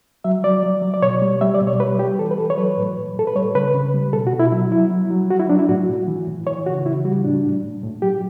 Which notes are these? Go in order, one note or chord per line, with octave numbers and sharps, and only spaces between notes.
F#3 E5
F#3 D5
F#3
F#3
D5
B2 C#5
G3
G3 E5
D5
B2
C#5
G3 B4
G3 G4
E3 A4
B4
E3 A4
C#5
F#3 B4
A2
A2
A2 A4
B4
G3 C#5
C#3 B4
C#3
G3
B2 A4
F#4
B2
E4
F#3 E4
F#3 E4
F#3
F#3
F#3 F#4
E4
F#3 D4
E4
A2 F#4
A2
E3
A2
E3 C#5
C#3 F#4
C#3 E4
G3 F#4
A2 D4
A2
A2
A2
F#3 G4